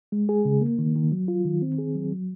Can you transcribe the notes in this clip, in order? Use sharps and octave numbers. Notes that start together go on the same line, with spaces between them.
G#3
G#4
C#3
A#3
D#3
D#3
F#3
F4
D#3
C4
G#4
F#3
F#3